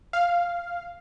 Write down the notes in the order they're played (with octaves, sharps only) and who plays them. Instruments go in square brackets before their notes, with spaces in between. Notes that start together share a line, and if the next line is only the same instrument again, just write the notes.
[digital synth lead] F5